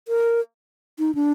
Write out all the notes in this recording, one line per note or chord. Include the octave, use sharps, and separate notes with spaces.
A#4
D#4
D4